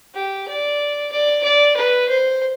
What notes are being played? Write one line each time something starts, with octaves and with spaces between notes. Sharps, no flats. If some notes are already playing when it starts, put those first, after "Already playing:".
G4
D5
D5
D5
B4
C5